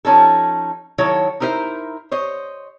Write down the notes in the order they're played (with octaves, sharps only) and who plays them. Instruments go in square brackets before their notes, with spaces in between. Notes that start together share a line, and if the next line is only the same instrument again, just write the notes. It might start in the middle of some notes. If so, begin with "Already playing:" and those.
[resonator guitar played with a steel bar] F3 C#4 D#4 A4
D#3 F#3 E4 A4 C#5
D#4 E4 A#4 C5 E5
C5 C#5 D#5